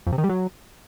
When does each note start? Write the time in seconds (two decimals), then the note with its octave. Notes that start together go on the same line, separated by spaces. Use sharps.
0.07 F2
0.12 C3
0.18 D#3
0.24 G3
0.29 F#3